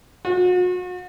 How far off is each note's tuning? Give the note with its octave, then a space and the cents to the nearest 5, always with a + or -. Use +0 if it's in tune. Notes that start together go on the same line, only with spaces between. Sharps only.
F#4 -40